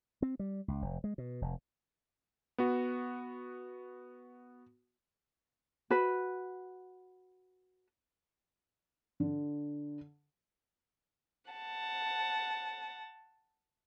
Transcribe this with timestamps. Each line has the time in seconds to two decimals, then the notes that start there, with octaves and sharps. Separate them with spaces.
0.22 C4
0.39 G3
0.68 C#2
0.82 F1
1.04 G#3
1.18 B2
1.42 F1
2.58 B3 F#4
5.90 F#4 B4
9.20 D3
11.51 F#5 A5